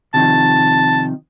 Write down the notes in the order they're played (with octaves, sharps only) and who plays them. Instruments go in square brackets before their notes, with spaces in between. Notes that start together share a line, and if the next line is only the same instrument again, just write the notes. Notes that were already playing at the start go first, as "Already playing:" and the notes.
[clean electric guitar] C3 D#3 F3 [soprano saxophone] A5